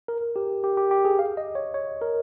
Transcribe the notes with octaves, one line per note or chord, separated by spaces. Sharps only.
A#4
G4
G4
G4
G4
G#4
F5
D#5
C#5
C#5
A#4